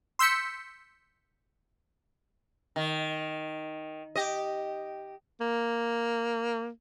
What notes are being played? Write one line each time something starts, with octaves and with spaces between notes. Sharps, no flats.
C6 E6 G6 B6 C#7
D#3
G4 D#5
A#3